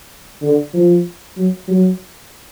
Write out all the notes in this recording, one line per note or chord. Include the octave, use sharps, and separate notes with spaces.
D3
F3
F#3
F#3